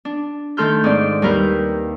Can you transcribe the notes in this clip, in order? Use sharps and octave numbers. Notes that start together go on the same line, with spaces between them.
D4
D#3 A3 A4 C6 F6 G6
G#2 C4 D5 C6
D#2 G3 A#3 A#4 B4 G6